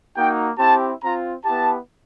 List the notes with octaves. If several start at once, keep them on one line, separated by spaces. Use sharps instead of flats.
A#3 D#4 F#4 G5
C4 E4 G4 A5
C4 F4 A#5
B3 E4 G4 A5